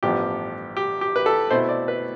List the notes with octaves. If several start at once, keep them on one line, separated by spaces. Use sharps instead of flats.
A1 G2 F3 B3 G4
G4
G4
B4
A4
B2 A3 C4 E4 C5
D5
B4